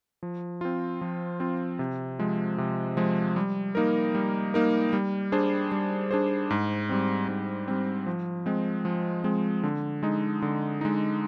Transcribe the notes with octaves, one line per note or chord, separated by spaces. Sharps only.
F3
C4 F4
F3
C4 F4
C3
F3 G#3
C3
F3 G#3
G3
A#3 D#4 A#4
G3
A#3 D#4 A#4
G3
D4 G#4 C5
G3
D4 G#4 C5
G#2
G3 C4
G#2
G3 C4
F3
G#3 C4
F3
G#3 C4
D3
G#3 D#4
D3
G#3 D#4